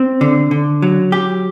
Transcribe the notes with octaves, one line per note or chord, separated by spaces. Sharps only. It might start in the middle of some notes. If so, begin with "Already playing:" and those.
Already playing: C4
D3
D3
F#3
G4